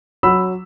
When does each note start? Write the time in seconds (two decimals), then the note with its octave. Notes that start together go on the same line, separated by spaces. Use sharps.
0.23 F#3 B5 E6